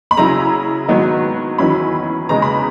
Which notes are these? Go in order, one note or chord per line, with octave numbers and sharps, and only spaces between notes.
B5
C#3 F#3 C#4 E4 A#5
G#2 D#3 F#3 B3 D#4
E2 D#3 F#3 C#4 E4 B5
E2 C#3 G#3 D#4 A#5
B5